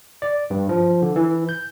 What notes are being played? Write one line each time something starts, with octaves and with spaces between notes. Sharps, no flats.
D5
G2
F3
D3
E3
G6